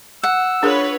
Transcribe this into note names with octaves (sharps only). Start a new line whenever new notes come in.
F#5 E6
D4 F4 G#4 A#4 B4 C#5